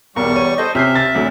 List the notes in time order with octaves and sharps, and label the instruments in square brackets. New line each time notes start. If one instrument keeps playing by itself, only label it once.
[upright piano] B1 A#4 [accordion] E2 G3 C#6
[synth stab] C#5 [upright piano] D#7
[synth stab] A4 D#5 [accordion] C5
[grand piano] C3 [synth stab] C#4 [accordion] E5 [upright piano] F6 G6 C7
[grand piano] A6
[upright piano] G#1 D2 D3 [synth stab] F#3